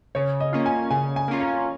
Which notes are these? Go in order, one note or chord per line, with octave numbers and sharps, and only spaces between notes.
C#3 C#5
D#5
A#3 C#4 F4
G#5
C#3 G#5
G#5
A#3 C#4 F4
A#5